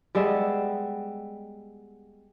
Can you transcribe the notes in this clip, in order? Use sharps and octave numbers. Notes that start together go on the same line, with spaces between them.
G3 G#3 B3 E5